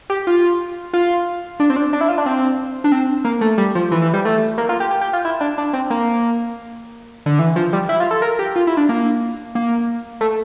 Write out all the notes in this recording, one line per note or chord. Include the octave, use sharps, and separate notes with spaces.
G4
F4
F4
D4
C4
D4
D4
E4
F4
D4
C4
D4
C4
A#3
A3
G3
F3
E3
E3
G3
A3
A#3
F4
G4
G4
G4
F4
E4
D4
D4
C4
A#3
D3
E3
F3
G3
E4
F4
A4
A#4
G4
F4
E4
D4
A#3
A#3
A3